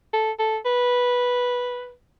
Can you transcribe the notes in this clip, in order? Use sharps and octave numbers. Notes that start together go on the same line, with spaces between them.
A4
A4
B4